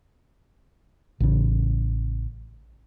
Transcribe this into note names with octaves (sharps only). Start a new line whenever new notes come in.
A1 C#3